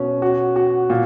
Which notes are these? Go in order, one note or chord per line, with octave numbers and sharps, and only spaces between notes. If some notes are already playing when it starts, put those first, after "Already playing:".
Already playing: B2 C#4
F#4
F#4
A#2